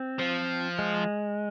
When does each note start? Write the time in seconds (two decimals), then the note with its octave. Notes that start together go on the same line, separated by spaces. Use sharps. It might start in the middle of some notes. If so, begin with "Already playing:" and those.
Already playing: C4
0.19 F3
0.79 G#3